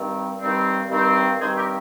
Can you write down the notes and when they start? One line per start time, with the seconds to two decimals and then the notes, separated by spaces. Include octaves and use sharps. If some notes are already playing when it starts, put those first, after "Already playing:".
Already playing: G2 D#3 G3 C4
0.41 G2 D#3 G3 C4
0.90 G2 D#3 G3 C4
1.39 G2 D#3 G3 C4 G#4 C5
1.56 G4 A#4